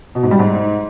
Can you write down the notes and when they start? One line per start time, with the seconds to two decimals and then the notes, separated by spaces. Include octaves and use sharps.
0.15 B2
0.23 G#2
0.31 G3
0.39 G#2